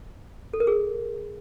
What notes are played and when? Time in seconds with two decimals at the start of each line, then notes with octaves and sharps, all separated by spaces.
0.53 A4
0.60 A#4
0.67 G#4